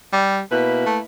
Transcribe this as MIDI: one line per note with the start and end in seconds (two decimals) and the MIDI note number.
0.13 0.41 55
0.51 0.82 47
0.51 1.01 58
0.51 1.01 64
0.51 1.01 71
0.86 0.99 57